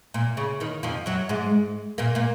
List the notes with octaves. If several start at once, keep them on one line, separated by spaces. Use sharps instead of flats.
A#2
C#3
D#2 D#3
F2 F3
F#2 F#3
G#2 G#3
A#2 A#3
A#2 A#3